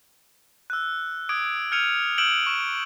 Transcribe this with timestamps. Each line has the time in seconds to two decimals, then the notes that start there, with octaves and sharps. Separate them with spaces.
0.70 E6 F#6
1.29 D6 D#6 G#6 D7
1.72 F6 G6 G#6 C#7 D#7 F7
2.18 E6 F6 G6 D7 E7 F#7
2.47 C#6 E7